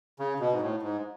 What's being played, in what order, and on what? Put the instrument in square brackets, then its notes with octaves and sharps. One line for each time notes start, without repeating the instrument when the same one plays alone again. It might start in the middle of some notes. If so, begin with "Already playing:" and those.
[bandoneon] C#3
B2
G#2
A2
G#2